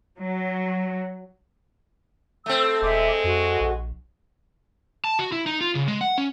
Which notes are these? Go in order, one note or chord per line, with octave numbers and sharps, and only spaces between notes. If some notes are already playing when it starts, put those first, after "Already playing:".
F#3
A3 C4 E6
D#1 G#3 E5 D6
F2 F#4
A#1
A5
F#4
E4
D#4
F4
C#3
G#3
F#5
C#4